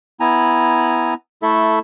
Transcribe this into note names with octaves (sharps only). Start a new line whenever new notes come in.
B3 E4 G#5 A#5
A3 E4 A4 E5